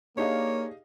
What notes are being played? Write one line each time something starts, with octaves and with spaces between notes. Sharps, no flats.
A#3 D4 D#4 G4 G#4 C#5 D#5 F5